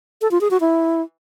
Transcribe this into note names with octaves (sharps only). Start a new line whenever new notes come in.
A4
F4
G#4
F#4
E4